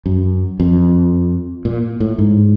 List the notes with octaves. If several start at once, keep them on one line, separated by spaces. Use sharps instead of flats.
F#2
F2
A#2
A2
G#2